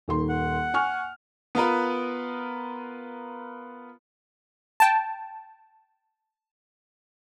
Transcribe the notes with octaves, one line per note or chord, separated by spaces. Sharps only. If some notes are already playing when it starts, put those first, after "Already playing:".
D#1 D#3 C6
F#5
G#5 C#6 F6
B3 F4 A#4 B4
G5 A5